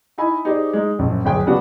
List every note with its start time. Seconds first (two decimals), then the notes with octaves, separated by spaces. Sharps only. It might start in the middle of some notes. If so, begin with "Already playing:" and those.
0.18 D#4 E4 D#5 G#5 B5
0.45 D#4 G4 G#4 C5 D5
0.73 G#3 D#4
0.99 A#1 F#2
1.24 D1 G1 G#4 G5 G#5
1.46 C#3 B3 D4 F#4 G4